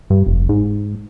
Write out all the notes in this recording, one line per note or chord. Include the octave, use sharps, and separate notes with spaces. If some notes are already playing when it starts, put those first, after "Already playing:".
G2
F1
G#2